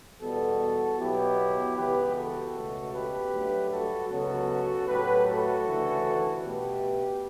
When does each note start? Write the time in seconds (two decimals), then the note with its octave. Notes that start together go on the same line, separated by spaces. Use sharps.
0.21 E2 B2 G3 B3 F#4 A4
0.99 B2 F#3 B3 E4 G4
1.76 C#2 C#3 E3 B3 G4 B4
2.15 F#4 A4
2.54 C#2 B2 A3
2.93 G4 B4
3.32 G2 F#3 A3
3.71 F#4 A4
4.09 C#2 C#3 F#3 B3 F#4 A4
4.87 A2 F#3 A3 G4 B4
5.26 F#4 A4
5.65 D2 C#3 E3 A3
6.43 B2 A3 G4 B4